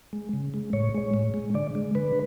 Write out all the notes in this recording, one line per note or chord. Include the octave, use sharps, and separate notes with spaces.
G#3
C#3
G#3
A2 C#5
G#3
A2
G#3
D3 D5
G#3
D3 B4